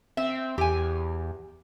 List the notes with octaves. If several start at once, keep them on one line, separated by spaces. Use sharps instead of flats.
C4 E5
E2 G4 G#5